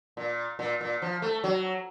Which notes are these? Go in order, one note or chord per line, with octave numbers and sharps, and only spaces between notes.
A#2
A#2
A#2
F3
A3
F#3